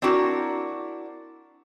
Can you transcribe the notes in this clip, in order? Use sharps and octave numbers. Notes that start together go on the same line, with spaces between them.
C4 D4 E4 F#4 A#4